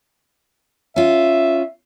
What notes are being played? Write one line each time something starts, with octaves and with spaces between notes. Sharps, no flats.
C#4 F4 E5